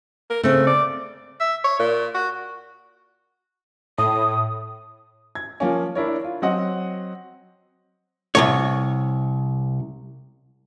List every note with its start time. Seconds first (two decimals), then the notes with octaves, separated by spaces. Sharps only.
0.30 A#4
0.43 C#3 A3 C4
0.67 D5
1.40 E5
1.64 C#5
1.79 A#2
2.14 F#4
3.98 A2 D#6
5.35 G#6
5.60 F3 A#3 C#4
5.95 D4 E4 A#4 C#5
6.24 F4
6.42 F#3 C4 D#5 F#5
8.35 C2 B2 C#5